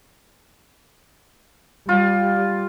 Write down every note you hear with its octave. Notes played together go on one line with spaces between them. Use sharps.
G3 F4